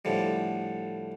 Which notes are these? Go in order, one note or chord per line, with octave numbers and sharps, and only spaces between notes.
A2 D3 F3 G3